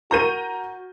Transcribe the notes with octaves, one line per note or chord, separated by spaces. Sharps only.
F#4 A#4 A#5 C#6 G6 D#7